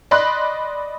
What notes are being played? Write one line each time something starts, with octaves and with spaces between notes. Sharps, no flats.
D5 D#5 B5 C6 F#6